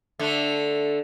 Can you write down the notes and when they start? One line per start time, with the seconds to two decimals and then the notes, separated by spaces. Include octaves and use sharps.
0.19 D3 A3